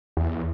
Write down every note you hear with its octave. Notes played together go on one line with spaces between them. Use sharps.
E2